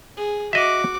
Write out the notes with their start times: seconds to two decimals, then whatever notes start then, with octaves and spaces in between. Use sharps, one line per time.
0.17 G#4
0.53 F#4 D#5 E5 D6